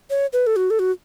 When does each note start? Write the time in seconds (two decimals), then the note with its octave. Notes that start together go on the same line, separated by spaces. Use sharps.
0.10 C#5
0.33 B4
0.47 A4
0.56 F#4
0.70 A4
0.79 F#4